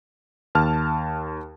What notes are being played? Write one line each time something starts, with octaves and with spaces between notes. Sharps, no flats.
D#2 A5 F6